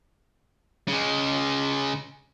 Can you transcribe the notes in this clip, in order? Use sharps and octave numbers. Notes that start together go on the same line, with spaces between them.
C#3 G#3